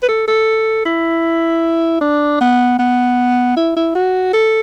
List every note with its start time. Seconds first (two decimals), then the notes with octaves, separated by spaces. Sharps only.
0.03 B4
0.09 A4
0.28 A4
0.86 E4
2.01 D4
2.41 B3
2.79 B3
3.57 E4
3.77 E4
3.95 F#4
4.33 A4